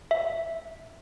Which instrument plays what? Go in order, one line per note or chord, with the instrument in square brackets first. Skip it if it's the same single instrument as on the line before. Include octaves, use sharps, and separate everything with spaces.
[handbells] E5